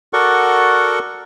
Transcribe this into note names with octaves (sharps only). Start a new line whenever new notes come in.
F#4 A4 A#4 D5 F#5 C#6